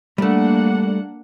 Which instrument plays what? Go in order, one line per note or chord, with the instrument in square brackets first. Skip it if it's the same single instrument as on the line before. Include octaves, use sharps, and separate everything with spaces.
[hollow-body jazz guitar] G3 A3 [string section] A#3 D4 F#5